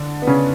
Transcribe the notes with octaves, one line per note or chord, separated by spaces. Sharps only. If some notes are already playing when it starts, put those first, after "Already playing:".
Already playing: D3 D4
B3
C#3 C#4